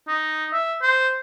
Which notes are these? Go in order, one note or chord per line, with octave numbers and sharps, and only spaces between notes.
D#4
E5
C5